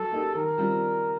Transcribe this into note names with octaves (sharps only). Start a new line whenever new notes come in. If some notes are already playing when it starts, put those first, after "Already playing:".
Already playing: F#3 A4
A#3 D#4 G4
D#3 A#4
G3 C4 F4